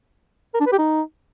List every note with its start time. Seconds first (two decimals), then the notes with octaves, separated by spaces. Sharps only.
0.54 A#4
0.60 D4
0.66 B4
0.72 G4
0.78 D#4